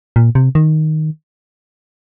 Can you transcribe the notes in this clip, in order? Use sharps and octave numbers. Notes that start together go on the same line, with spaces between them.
A#2
C3
D#3